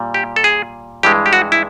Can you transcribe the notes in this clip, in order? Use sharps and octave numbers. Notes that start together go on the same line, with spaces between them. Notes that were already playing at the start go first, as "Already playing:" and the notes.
Already playing: A#2 G3
G4
A4
G#4
G2 E3 G#3 G4
G4
F#4
E4